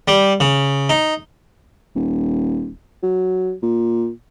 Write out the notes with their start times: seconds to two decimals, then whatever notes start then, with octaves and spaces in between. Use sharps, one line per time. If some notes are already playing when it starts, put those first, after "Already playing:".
0.08 G3
0.40 C#3
0.89 D#4
1.96 D#1
3.03 F#3
3.63 A#2